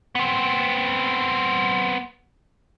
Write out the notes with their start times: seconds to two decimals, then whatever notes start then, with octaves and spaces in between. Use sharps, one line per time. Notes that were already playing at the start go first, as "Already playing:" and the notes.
0.15 B3 C4